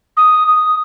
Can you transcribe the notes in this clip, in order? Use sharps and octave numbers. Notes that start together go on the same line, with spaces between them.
D#6
D#6